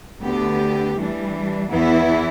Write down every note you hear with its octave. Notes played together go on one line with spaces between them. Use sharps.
D2 D3 B3 G4
E3 G3 D4
E2 E3 B3 E4